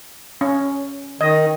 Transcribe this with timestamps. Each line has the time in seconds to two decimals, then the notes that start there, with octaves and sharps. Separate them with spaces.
0.41 C#4
1.21 D#3 D#5